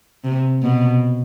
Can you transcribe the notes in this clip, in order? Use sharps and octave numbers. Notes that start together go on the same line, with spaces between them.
C3
B2